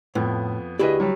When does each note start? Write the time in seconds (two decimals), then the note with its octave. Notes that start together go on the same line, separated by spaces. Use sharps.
0.15 F2 A2 F3 B3
0.79 D2 E4 G4 G#4 B4 D5 D#5
1.00 F#3 G3